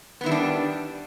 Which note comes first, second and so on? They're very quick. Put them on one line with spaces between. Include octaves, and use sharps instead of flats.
B3 D#3 E4 G3 D4